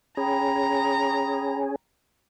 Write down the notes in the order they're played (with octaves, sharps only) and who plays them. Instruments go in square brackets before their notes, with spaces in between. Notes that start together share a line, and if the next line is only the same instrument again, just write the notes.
[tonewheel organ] C#4 G#4 [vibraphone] G5 B5 [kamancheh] A#5